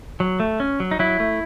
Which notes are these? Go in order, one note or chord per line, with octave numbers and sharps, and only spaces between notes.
F#3
A3
C#4
F#3
D#4
F#3 E4
A3